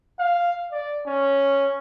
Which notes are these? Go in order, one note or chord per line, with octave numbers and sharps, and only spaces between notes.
F5
D5
C#4